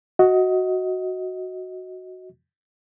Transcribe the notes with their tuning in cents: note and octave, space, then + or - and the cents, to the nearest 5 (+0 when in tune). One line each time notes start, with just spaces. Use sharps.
F#4 +0 D#5 +20